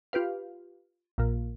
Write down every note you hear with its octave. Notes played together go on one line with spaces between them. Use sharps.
F4 G4 B4 F5
A#1 A#2